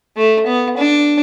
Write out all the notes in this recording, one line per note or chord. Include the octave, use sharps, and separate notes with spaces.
A3
B3
D4